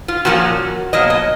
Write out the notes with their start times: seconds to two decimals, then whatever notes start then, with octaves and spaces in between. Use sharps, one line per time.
0.08 F4
0.25 A#2 F3 A#3 C#4 F#4
0.93 B2 F#3 A#3 D#5
1.10 D#5